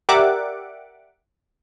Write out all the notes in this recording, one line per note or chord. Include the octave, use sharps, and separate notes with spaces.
G4 A#4 D5 E5 F#5 D6